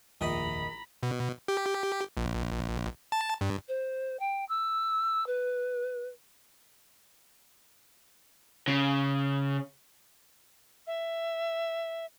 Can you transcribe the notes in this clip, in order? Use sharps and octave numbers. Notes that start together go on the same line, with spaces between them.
F1 A#1 D#2 D#3 D#4 A#5 B5
B2
G4
A#1
A5
G2
C5
G5
E6
B4
C#3
E5